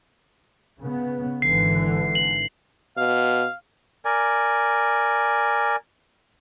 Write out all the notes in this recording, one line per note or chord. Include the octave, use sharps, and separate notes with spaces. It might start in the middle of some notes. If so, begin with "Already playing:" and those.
C#3 B3
G#1 D3 E3 C7
F#7
B2 F5
A#4 D5 G#5